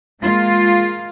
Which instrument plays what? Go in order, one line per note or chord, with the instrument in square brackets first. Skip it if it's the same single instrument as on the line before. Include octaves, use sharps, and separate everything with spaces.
[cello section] G#3 A#3 F4